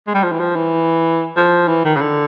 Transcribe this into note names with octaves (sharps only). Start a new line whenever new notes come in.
G#3
G3
F3
E3
F3
E3
F3
E3
D#3
C#3
D3